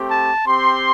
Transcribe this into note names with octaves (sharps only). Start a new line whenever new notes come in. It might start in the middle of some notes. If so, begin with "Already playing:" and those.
Already playing: A3 C4 G4
A5
C4 G4 C6